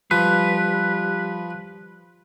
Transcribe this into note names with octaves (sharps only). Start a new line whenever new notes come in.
F3 G3 B4